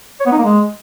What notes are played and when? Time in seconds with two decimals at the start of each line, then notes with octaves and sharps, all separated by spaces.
0.20 C#5
0.26 B3
0.32 D#4
0.38 A#3
0.44 G#3